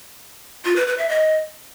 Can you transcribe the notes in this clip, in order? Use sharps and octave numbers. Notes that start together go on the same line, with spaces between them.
F4
B4
B4
E5
D#5